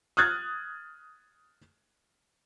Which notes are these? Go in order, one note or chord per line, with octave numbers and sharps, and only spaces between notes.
D#6 F6 F#6 G#6 A6